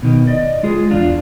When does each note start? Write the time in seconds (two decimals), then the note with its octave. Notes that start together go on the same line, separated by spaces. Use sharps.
0.03 B2 D#3
0.27 D5 D#5
0.63 G#3 F4 G#4
0.91 E2 D4 F4